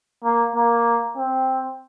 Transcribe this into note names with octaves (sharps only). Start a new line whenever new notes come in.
A#3
A#3
C4